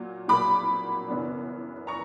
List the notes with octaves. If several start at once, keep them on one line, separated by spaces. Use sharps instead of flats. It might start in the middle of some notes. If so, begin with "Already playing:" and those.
Already playing: A#2 F#3
A#2 F#3 A#3 B5 D6
F#1 F#2 E3 B3 D4
A#5 C#6